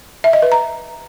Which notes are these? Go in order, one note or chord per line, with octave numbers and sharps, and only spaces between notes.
E5
D#5
B4
A#5